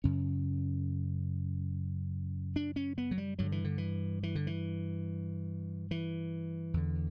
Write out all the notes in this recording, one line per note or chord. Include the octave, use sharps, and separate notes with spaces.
F#2 C#3 C#4
D4
C#4
B3
F#3
G3
G2 D3 F#3
E3
D3
E3
E3
D3
E3
E3
E2 D3